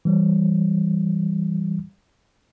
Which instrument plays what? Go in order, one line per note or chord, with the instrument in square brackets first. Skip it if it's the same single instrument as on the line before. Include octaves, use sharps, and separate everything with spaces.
[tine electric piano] E3 G3